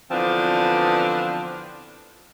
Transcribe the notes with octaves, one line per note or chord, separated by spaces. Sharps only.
D3 E3 F3 B3 C4 D4